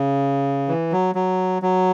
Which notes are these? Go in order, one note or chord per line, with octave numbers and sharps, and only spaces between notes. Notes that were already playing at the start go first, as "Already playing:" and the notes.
Already playing: C#3
E3
F#3
F#3
F#3